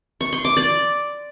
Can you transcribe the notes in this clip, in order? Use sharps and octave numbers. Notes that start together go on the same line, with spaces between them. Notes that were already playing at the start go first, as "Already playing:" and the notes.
C#6
C6
D6
D5